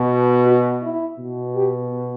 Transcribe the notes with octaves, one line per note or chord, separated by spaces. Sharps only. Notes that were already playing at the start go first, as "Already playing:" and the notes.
Already playing: B2
F#4
E4
B2
G4